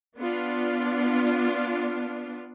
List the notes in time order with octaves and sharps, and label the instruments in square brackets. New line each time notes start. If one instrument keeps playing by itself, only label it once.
[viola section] B3 D4 F4